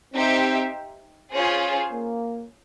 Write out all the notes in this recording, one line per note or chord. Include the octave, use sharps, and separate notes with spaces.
C4 D#4 G4 C5 E5
C#4 F4 G#4 C5
A#3